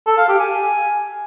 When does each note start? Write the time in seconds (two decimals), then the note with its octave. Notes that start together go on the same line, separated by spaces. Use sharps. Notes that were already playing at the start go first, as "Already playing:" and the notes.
0.07 A4
0.18 F5
0.29 G4
0.40 G#5